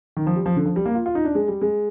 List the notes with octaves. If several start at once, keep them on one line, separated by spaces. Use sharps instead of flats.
D#3
F3
G3
F3
D3
F3
G3
A#3
F4
F4
D#4
D4
G#3
G3
G#3